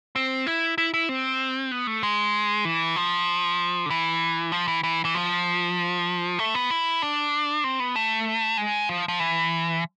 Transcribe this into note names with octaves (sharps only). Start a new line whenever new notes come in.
C4
E4
E4
E4
C4
B3
A3
G#3
E3
F3
D3
E3
F3
E3
E3
E3
F3
A3
B3
E4
D4
C4
B3
A3
G#3
F3
F3
E3